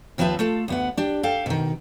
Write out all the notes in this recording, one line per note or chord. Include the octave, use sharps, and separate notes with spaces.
D#2 F3 C4 B4 E5 A5
A3 F4 A4
D2 B3 F#5
D4 G4
A4 F5 G5
B2 D#3